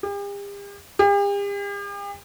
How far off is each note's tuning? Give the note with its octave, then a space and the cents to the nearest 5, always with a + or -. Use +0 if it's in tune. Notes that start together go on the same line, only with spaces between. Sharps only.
G4 +45
G4 +45